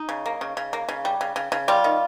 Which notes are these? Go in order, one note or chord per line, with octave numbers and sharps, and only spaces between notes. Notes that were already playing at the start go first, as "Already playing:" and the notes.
Already playing: D#4
C#3
A#3
C#3
C#3
A#3
C#3
G3
C#3
C#3
C#3
G3 F4
D#3